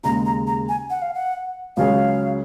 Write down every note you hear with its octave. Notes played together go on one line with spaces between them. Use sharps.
D#2 C#3 G#3 A#5
A#5
A#5
G#5
F#5
F5
F#5
C#2 C#3 F#3 C#4 G#4 F5